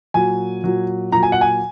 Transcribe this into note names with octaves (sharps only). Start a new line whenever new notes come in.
A#2 F#3 G#5
A#2 F#3
A#2 F#3 A#5
G#5
F#5
G#5